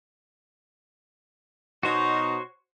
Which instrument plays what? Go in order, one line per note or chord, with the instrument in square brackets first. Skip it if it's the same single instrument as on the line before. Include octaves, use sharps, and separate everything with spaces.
[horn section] B2 D#4 [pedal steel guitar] F#4 C5 C#5